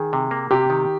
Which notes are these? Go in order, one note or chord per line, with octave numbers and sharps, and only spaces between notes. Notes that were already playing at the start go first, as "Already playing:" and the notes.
Already playing: D#3 G#4
C3
A#3
C3 G4
D#3